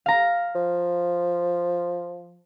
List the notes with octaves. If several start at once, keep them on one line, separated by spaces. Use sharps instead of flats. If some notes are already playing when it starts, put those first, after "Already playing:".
F5 A#5
F3